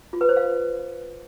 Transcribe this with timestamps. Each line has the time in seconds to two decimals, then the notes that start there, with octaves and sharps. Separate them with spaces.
0.13 F4
0.21 B4
0.29 C5
0.37 F5